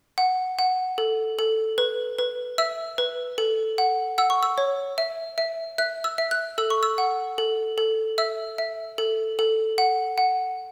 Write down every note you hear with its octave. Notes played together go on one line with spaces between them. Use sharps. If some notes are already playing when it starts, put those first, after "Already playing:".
F#5
F#5
A4
A4
B4
B4
E5 E6
B4
A4
F#5
F#5 E6
C#6
E6
C#5
E5
E5
E5 F#6
E6
E5
F#6
A4 E6
C#6
E6
F#5
A4
A4
E5 E6
E5
A4
A4
F#5
F#5